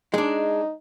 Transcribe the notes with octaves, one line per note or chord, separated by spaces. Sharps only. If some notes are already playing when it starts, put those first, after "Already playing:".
G#3 D4 D#4